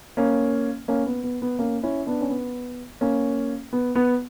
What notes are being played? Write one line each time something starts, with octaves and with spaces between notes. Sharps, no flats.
A#3 C#4
A#3 C#4
B3
B3
B3
A#3 C#4
C#4 E4
B3 D4
C#4
B3
A#3 C#4
B3
B3